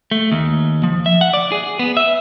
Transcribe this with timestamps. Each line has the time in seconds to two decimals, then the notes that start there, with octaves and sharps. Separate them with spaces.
0.11 A3
0.32 D#2
0.83 F3
1.06 E5
1.21 F#5
1.33 D5
1.52 G#4
1.79 B3
1.97 E5